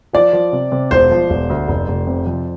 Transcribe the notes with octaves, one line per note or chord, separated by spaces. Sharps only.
F3 D5
F3
C3
C3
E1 C5
F3
E1
D2
F1
F1
C3
F2